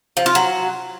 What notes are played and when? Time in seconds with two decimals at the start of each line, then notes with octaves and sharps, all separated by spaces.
0.17 F3
0.26 F4
0.35 F#3